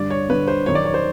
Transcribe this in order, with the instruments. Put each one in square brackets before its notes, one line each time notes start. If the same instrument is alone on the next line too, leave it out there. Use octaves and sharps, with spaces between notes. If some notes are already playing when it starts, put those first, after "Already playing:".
Already playing: [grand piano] G2 D3 D5
C#5
G2 D3 B4
C5
F#2 D#3 C#5
D5
C#5
C5